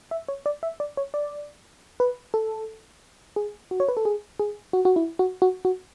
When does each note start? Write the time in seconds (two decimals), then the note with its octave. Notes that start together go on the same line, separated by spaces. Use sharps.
0.11 E5
0.29 C#5
0.46 D5
0.63 E5
0.80 D5
0.97 C#5
1.14 D5
2.00 B4
2.34 A4
3.36 G#4
3.71 F#4
3.80 C#5
3.89 B4
3.97 A4
4.05 G#4
4.40 G#4
4.73 F#4
4.85 F#4
4.96 E4
5.19 F#4
5.42 F#4
5.65 F#4